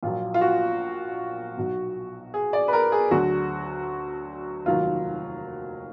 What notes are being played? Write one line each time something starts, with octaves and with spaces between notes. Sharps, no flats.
A#1 A#2 F#3 F4
F4
F#4
B1 B2 F#3
G#4
D5
B4
A#4
G#4
D2 D3 F#3 F#4
F1 D#2 D#3 F#3 F4